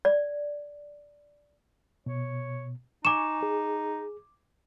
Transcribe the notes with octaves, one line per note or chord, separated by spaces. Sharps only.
D5
B2 C#5
D#4 G#5 C#6 D6 E7
G#4